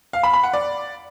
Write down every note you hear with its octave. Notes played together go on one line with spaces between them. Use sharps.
F5
B5
B5
F#5
D5